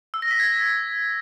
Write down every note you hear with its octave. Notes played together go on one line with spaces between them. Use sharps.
E6
A#6
B6
G#6